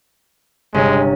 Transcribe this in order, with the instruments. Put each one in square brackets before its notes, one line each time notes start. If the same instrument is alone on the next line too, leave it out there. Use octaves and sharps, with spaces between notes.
[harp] G1 C3 C#4 [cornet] G#3